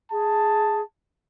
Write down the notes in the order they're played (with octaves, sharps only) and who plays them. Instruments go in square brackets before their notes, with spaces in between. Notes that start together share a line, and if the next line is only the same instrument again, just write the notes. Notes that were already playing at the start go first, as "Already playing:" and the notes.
[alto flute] G#4 [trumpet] A5